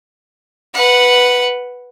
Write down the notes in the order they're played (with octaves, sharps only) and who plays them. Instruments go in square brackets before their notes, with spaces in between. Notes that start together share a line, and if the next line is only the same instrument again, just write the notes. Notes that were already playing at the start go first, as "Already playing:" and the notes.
[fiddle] B4 F#5